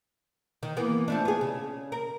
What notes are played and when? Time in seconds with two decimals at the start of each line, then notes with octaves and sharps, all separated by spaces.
0.63 D#3
0.77 E3 A#3 B3
1.08 F3 A3 D4
1.25 B3 G#4
1.41 C#3
1.92 A#4